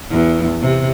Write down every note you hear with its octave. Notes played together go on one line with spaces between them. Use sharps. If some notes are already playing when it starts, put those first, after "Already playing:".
E2
C3